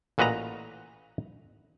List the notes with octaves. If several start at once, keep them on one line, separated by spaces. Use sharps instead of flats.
A1 A#2 F#4 B4 D#5 A#5